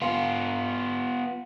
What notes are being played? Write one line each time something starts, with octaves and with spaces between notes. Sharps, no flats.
B3 F4